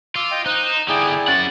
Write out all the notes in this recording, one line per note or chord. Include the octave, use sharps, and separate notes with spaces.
F4 D6 E6
D#5 G5
D#4 C5 F#6
E7
D3 E4 G4 G#4 D5 D#6
C#4 F#5 A6